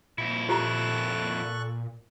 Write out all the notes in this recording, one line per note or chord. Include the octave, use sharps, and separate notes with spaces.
F2 A#2 E4
F4 G4 A4 A#5 C#6 F#6